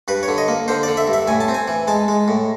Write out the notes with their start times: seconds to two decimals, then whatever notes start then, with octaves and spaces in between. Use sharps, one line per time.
0.08 G2 B4
0.23 C#5
0.28 D3
0.38 D#5
0.48 A#3
0.68 D3 C5
0.83 D3 D5
0.97 E5
1.07 G2
1.13 E5
1.27 A2 G#5
1.40 A5
1.48 C4
1.54 G#5
1.68 E3
1.88 G#3 A5
2.08 G#3
2.28 A2